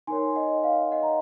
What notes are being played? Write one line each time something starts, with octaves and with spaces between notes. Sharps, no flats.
D#4 A#4 C#5 G#5 C6
D#5 F#5
F5
D#5 F#5
A#5